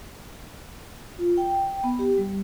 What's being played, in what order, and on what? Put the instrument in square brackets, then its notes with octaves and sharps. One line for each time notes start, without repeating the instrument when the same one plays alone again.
[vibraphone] F4
G5
B3
G4
G3